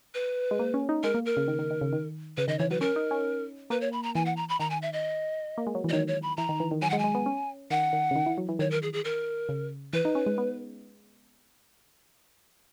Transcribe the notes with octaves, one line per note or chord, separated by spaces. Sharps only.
B4
G#3
A#3
C#4
D#4
G#3 A#4
A#3
A#4
C#3
D#3
D#3
D#3
C#3
D#3
C#3 B4
D#3 D#5
E3 C#5
F#3 B4
C#4 A#4
D#4
C#4
A#3 B4
C#5
B5
A#5
E3 G#5
F#5
A#5
B5
D#3 A#5
G#5
E5
D#5
A#3
G#3
F#3
E3
D#5
D#3 C#5
C#5
B5
E3 A#5
D#3
E3
D#3
F#3 G#5
G#3 F#5
G#5
G#3
B3
C#4
D#3 F#5
D#3
C#3
D#3
E3
F#3
E3
D#3 C#5
A#4
G#4
G#4
A#4
C#3
E3 B4
D#4
C#4
G#3
B3